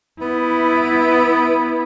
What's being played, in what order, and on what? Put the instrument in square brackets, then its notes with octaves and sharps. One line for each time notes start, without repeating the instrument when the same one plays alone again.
[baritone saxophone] B3 [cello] E4